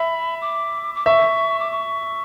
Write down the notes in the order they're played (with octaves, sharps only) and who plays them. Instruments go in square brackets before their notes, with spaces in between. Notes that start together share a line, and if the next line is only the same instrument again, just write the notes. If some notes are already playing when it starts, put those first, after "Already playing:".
Already playing: [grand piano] E5 [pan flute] B5
[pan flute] D6
D6
[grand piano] E5 [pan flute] C#6
[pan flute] D6
C#6